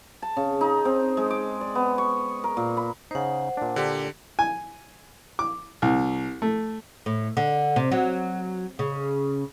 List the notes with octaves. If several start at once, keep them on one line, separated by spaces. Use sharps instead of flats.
A5
C#3
D#4
C4
G#3
D6
D5
B3
C#6
A#4
A#2
B5
C#3 D#4 C5 F#5
A#2 D4
D3 G4
G#5
D6
C2
A3
A2
D3
C3
F#3
C#3